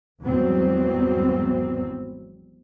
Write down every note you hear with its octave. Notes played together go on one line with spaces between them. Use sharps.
G#1 E2 F#3 G3 B3 C4